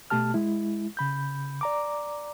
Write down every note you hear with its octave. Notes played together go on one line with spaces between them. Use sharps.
B2 A3 G4 A5 F6
G#3 E4
C#3 B5 G6
D5 A#5 D6